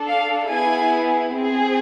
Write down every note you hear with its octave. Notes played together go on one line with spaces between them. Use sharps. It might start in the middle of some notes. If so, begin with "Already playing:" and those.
Already playing: D4 A4
F5
B3 E4 G#4 G#5
C4 G#4